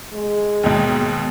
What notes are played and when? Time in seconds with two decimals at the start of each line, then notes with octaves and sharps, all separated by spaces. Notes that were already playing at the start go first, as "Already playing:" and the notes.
0.13 G#3
0.63 D#2 G#2 B2